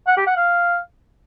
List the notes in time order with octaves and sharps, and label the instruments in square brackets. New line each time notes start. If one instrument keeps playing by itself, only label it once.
[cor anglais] F#5
G4
F#5
F5